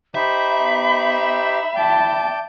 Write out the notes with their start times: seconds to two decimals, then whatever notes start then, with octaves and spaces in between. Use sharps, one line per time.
0.15 D#4 G4 C5 E5 B5
0.60 B3
1.76 D5 G5 A5 G6